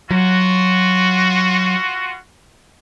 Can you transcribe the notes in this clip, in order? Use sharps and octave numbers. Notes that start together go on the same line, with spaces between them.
F#3 F4 F#4